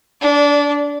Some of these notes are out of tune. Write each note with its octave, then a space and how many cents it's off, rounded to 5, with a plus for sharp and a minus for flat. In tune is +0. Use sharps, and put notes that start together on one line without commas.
D4 -25 D5 +0